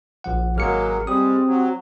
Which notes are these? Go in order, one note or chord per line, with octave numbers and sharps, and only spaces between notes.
A#1 F3 F#5
G#1 F#3 G#3 A#3 F6 C#7
G3 G#3 C4 G4 D#6
F#3